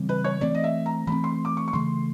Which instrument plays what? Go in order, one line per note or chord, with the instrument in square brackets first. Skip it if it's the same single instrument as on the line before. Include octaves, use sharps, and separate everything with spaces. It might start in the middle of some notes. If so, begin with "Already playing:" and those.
Already playing: [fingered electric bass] C#3 E3 G3 C4
[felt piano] B4
C#5
[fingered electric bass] E3 A3 C4 [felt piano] D5
[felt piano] D#5
E5
A#5
[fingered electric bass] E3 A3 C4 [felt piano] B5
[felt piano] C6
D6
C#6
C#6
[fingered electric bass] C#3 E3 A3 [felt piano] C6